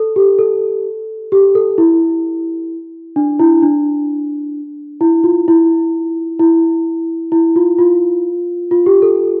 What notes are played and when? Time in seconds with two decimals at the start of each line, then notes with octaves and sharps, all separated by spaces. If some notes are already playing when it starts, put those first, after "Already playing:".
Already playing: A4
0.16 G4
0.39 A4
1.32 G4
1.55 A4
1.78 E4
3.16 D4
3.39 E4
3.62 D4
5.01 E4
5.24 F4
5.48 E4
6.39 E4
7.32 E4
7.56 F4
7.79 F4
8.71 F4
8.86 G4
9.02 A4